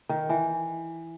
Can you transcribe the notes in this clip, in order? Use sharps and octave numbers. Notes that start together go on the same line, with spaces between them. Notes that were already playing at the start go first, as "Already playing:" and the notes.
D#3
E3